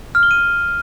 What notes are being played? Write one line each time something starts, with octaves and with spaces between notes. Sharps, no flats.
F6
G7
D#7